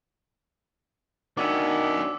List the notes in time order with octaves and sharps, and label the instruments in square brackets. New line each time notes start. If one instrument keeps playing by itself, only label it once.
[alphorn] D#3 [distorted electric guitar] B3 C#4 [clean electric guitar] D4 F#4 [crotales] D6 E6